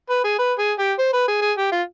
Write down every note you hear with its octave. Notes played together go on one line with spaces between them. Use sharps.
B4
G#4
B4
G#4
G4
C5
B4
G#4
G#4
G4
F4